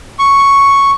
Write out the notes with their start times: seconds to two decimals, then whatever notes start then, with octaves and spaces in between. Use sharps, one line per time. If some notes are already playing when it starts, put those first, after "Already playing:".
0.19 C#6